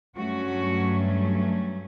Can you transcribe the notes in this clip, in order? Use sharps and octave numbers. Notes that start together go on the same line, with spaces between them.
G2 F#3 A3 C#4 F#4